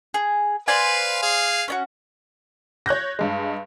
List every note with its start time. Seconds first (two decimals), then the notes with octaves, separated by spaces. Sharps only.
0.14 G#4
0.68 B4 C5 D5 F5 G#5
1.22 G#4 F5
1.68 C#4 D4 F#4
2.86 C#5 F#6 G6 A#6
3.19 G2 G#3